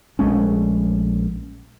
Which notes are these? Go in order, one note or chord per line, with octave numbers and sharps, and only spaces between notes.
A#1 G#3 A3 C#4